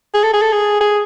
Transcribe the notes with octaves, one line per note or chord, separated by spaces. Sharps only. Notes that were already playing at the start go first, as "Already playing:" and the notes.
G#4
A4
G#4
A4
G#4
G#4